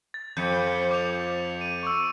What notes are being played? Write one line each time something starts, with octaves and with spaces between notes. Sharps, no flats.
A6
F2 G6 C#7
D6 F7
D#7
C#6 E6